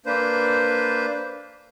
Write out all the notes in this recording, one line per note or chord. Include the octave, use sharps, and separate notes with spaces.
A#3 D4 B4 C5